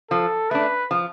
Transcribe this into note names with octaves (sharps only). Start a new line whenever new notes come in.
F3 A4
A3 D4 B4
F3